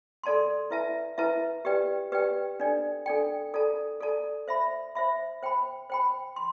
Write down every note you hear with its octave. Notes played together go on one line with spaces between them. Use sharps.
A4 D5 A5 C6
E4 B4 E5 A5
E4 B4 E5 A5
G4 B4 D5 G5
G4 B4 D5 G5
D4 A4 D5 G5
D4 A4 D5 G5
A4 D5 A5
A4 D5 A5
C5 E5 B5
C5 E5 B5
C5 G5 B5
C5 G5 B5
C6